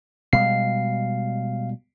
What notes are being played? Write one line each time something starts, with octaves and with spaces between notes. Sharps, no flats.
B2 G3 G#3 F5 C7